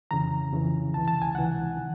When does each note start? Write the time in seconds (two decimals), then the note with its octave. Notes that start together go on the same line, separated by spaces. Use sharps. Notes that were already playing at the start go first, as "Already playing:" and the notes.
0.11 F2 C#3 E3 A#5
0.53 F2 C#3 E3
0.94 C#2 C3 E3 A5
1.08 A5
1.22 G#5
1.35 C#2 C3 E3 F#5
1.77 D#3